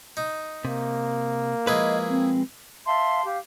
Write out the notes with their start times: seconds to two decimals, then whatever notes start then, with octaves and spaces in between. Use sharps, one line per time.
0.17 D#4
0.65 C3 A#3
1.67 F3 G#3 E4 G#4 B4 D#5
2.09 C4
2.86 E5 F5 A5 C6
3.25 G4 F5